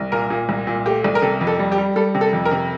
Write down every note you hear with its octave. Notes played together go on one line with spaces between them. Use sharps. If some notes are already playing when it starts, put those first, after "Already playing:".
Already playing: C2
A#2 A#4
A#2
C2
A#2
A3 G4
C2
A#4
C3 A4
F2
A4
G3
G4
G3
G3 A4
C3
A4
F2
A#4
C3